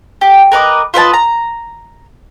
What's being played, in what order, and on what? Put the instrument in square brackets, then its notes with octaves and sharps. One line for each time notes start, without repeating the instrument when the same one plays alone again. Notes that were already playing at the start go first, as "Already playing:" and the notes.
[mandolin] G4
A#4 B4 D#5 D6
F4 B4 D#5 A5
A#5